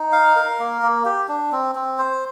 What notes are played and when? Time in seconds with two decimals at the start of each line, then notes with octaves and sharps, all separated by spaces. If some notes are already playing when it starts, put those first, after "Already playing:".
Already playing: D#4
0.12 F5
0.36 A#4
0.59 A#3
0.82 A#3
1.05 G4
1.28 D4
1.52 C4
1.75 C4
1.98 C5